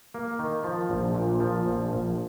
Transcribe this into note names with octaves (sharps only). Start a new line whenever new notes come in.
A#3
D#3
F3
A#1
A#2
F3
A#1
A#1